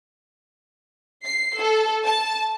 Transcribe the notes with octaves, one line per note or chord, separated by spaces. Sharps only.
C7
A4
A5